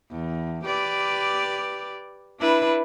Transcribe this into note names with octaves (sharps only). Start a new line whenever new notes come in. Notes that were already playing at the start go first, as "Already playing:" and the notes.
E2
G4 B4 D5
D4 E4 B4